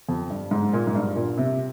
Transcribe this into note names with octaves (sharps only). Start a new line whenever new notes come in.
F2
G2
G#2
A#2
G#2
G2
A#2
C3